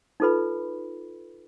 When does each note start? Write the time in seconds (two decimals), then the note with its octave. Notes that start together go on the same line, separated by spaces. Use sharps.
0.20 D#4 F4 A4 B4 B5